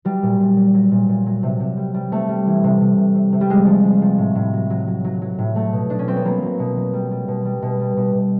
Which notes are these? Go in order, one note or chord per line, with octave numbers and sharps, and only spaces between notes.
F#3 G3
A#2
A#2
F#3
F#3
A#2
A#2
F#3
C3
C3
G3
G3
C3 A3
G3
E3
C3
C3
C3
C3
C3
G3
F3 G#3
F3
F3
F3
A2
A2
F#3
F#3
F#3
F#3
F#3
A2
F#3 A3
B2
B2 D4
C#4
F#3 C4
B3
F#3 A#3
F#3
B2
F#3
G3
G3
B2
G3
B2
G3
B2
B2